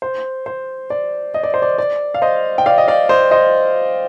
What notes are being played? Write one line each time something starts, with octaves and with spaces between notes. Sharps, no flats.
C5
C5
D5
D#5
D5
C5
D5
D5
F5
C5 D#5
G5
D5 F5
D#5
D5 F5
C5 D#5
C5 D#5